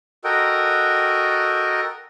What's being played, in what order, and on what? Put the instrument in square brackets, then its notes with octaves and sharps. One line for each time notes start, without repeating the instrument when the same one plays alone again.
[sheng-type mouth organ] F#4 A4 A#4 D#5 G5